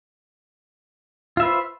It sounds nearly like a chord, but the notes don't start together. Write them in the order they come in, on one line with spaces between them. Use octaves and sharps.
F4 E5 B4 C5